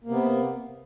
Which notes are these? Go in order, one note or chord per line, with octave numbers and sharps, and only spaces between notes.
C3 A#3 B3